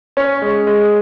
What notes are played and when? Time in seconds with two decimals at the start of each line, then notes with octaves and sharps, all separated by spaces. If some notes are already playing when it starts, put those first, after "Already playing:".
0.17 C#4
0.42 G#3
0.67 G#3